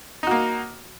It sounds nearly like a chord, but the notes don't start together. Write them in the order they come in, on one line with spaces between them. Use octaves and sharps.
D#4 F#4 A#3